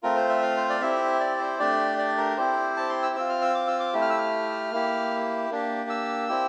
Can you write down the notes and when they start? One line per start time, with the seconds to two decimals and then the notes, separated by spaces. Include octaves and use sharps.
0.03 A3 C4 F4 A#4
0.16 C5
0.29 E5
0.42 F5
0.57 C5
0.70 D5
0.81 C4 E4 G4 E5
1.20 D5
1.40 C5
1.59 A3 D4 G4 D5
1.98 D5
2.18 A#4
2.37 C4 E4 G4 C5
2.77 A5
2.90 C6
3.03 E6
3.16 C4 F4 E6
3.29 F6
3.42 E6
3.55 D6
3.67 E6
3.80 D6
3.94 A3 E4 G4
4.02 F6
4.10 E6
4.18 F6
4.72 A#3 E4 G4
5.50 A#3 D4 G4
5.90 E6
6.28 C4 E4 G4